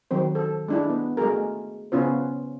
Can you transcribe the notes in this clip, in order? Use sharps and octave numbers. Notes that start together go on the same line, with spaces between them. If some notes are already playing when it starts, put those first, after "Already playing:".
D#3 F#3 C4 C5
A4
G#3 D4 E4
B3
G#3 A3 F#4 G#4 A#4
C#3 B3 C#4 F4 C5